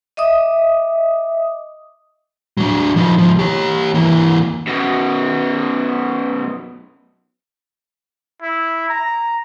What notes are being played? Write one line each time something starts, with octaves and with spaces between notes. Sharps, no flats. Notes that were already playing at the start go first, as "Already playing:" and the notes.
D#5 E5 D6 D#6
F#3 D4
F3 D#4
C#2 F3
G4 C#5
E3 A#3
F#2 B2
E4
A#5